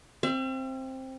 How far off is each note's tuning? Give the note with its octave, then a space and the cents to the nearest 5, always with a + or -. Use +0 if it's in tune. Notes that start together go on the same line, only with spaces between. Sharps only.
C4 +10 E5 +45